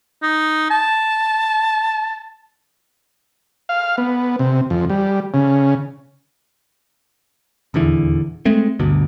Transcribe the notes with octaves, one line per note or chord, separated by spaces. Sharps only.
D#4
A5
F5
B3
C3
F2
G3
C#3
D#1 E2 D3 E3
G#3 A3 C4
G1 D2 G2 B2